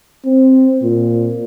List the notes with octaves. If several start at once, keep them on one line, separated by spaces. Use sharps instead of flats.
C4
A#2